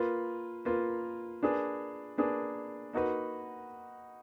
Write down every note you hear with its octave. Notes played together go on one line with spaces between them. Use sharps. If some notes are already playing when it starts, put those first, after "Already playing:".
Already playing: A#3 F4 B4
A#3 F4 B4
A#3 D4 G#4 B4
A#3 D4 G#4 B4
A#3 D#4 F#4 B4